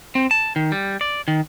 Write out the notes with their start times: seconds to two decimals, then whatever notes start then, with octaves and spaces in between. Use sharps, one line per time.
0.15 C4
0.31 A5
0.56 D#3
0.72 G3
1.01 D5
1.28 D#3